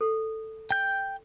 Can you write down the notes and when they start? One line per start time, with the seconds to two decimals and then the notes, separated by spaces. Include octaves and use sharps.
0.01 A4
0.71 G5 G6